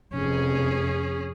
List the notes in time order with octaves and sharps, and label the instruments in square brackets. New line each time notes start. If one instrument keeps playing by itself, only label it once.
[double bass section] F1 F2 [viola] C#4 G#4